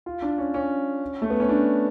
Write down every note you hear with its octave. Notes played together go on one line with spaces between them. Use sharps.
F4
D4
C#4
C#4
A3
B3
C#4
D4